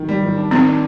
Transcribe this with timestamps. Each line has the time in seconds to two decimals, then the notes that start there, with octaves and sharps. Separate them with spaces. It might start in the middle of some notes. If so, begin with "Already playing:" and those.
Already playing: D#3
0.09 G3
0.23 D#3
0.37 D4
0.51 D#3 C4
0.67 D4